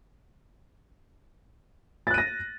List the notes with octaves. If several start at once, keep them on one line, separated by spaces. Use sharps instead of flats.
F#6 A6 A#6 D#7